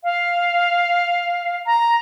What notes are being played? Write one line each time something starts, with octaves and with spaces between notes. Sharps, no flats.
F5
A#5